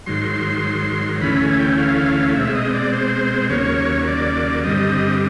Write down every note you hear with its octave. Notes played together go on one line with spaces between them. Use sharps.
G#2 D#3 F#3 C6
D2 C#3 E3 A3 C#4 B5
G#5
G5
F5
B2 G#3 C4 E5
D#5
D5
C5
D#2 C#3 F#3 A#3 C#5
D5
G2 D3 G3 C4 D#5